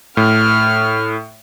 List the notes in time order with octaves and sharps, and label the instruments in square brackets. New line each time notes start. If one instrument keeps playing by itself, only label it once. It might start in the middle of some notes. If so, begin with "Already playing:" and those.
[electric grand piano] A2 [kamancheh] F6